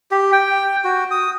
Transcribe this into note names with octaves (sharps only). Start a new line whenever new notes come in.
G4
G5
F#4
D#6